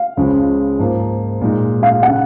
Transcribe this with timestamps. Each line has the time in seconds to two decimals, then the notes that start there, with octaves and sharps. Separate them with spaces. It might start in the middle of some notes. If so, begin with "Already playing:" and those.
Already playing: F5
0.17 C#2 C#3 F3 G#3 C#4
0.79 G#2 F3 A#3 F4
1.41 A#2 G#3 D#4
1.83 F5
2.03 F#5
2.08 C#3